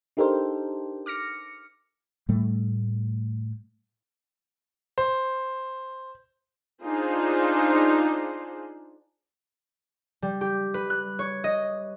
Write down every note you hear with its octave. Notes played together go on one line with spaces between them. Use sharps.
D4 D#4 G4 A4 A#4 C5
D6 F6 A#6 C#7
A2 G3 A3
C5
D4 D#4 F4 G#4 C5
G3
G4
B4
F#6
C#5
D#5